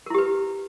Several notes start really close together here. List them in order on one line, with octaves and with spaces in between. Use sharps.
A#4 E4 G4 B4